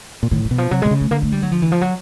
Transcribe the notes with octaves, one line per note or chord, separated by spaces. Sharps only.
A#2
A2 D#3
E3
B2
F3
C3 F#3
C3 G#3
C#3
A3
D3 A#3
A3
G3
F#3
F3
E3
F3
F#3